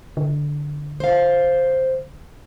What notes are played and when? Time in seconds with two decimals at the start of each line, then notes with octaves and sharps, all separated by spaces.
0.17 D3
1.00 C5 F5